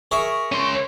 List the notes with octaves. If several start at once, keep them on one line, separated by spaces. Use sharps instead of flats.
G#4 A#4 E5 C#6
C#4 C6